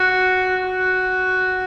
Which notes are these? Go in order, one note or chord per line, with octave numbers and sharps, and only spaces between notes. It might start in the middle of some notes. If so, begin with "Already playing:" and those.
Already playing: F#4
F#4